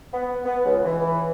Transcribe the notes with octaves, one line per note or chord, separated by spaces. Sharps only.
B3
B3
C#2
E3